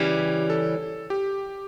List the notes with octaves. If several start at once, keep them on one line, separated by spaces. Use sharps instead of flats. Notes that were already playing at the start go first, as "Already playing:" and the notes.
Already playing: C#3 E3 G3 C#4 G4
A4
G4